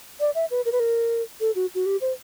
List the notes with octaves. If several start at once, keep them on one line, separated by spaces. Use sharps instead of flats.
D5
E5
B4
A#4
B4
A#4
A4
F#4
F#4
G4
C5